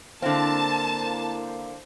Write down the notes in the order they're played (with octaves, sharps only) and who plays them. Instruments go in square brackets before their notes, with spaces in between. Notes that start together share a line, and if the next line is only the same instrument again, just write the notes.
[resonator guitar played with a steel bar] D3 C4 [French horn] A#3 [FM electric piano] E4 C5 F5 [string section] A5